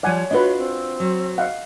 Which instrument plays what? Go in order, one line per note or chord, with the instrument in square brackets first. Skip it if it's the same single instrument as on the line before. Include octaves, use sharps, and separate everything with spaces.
[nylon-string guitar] F3 G3 [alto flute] C#5 [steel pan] D5 F#5 G#5
[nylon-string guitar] D4 F4 F#4 [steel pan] B4 D#5
[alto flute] C4
[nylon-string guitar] F#3
[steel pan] D#5 F5 F#5